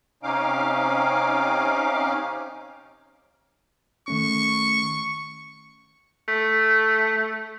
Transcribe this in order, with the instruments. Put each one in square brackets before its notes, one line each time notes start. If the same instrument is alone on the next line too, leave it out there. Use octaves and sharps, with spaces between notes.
[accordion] C3 C#4 D#4 F5 D6
[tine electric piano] D#3 A3 C#4 [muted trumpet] C#6
[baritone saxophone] A3